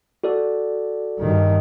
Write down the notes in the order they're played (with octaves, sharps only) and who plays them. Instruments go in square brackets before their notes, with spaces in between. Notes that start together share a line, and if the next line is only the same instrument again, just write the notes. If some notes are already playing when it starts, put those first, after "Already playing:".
[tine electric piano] F#4 A4 D5
[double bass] G2 D#3